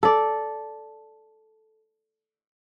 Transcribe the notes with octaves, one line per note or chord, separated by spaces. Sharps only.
A4 D5